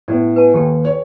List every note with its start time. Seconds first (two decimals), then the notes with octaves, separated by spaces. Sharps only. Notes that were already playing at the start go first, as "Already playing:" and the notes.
0.08 A2 B3 D5
0.36 B4 G#5 A5
0.54 D#2 G4 A4 G5
0.85 C#5